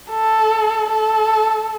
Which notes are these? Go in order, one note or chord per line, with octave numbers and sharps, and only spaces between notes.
A4
A4